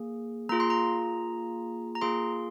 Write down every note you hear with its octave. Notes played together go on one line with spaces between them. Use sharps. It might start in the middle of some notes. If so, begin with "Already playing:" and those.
Already playing: A#3 G#4
A#3 F4 G#4 A#5
C6
A#5
A#5
A#3 F4 G#4 C6